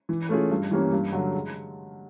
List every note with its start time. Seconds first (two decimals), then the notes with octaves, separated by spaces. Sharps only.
0.09 E3
0.29 A3 C#4 F4 G#4
0.51 G2
0.71 E3 G3 A#3 C#4
0.93 G2
1.13 D3 F#3
1.34 G#3